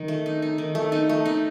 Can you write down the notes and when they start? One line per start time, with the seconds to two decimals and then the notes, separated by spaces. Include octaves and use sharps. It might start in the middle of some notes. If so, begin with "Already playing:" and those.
Already playing: D#3
0.08 A3
0.26 D#4
0.42 D#4
0.58 D#3
0.75 A3
0.92 D#4
1.09 A3
1.25 D#4